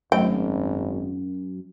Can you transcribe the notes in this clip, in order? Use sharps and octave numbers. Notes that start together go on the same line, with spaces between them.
G#1 F#2 F#3 A3 D#5 G5